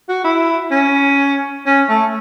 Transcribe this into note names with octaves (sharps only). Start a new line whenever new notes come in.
F#4
E4
C#4
C#4
A3